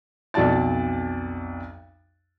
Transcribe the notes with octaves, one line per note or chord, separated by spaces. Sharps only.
B1 F2 F#4 D5 A5 A6